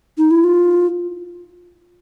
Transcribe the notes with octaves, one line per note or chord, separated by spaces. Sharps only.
D#4
E4
F4